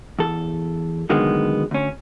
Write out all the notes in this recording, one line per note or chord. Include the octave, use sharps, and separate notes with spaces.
E2 A4
C2 D3 D#3 F#3 G#3 B3
D2 C#4